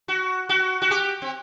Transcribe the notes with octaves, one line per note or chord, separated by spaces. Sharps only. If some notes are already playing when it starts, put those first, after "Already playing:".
F#4
F#4
F#4
G4
C4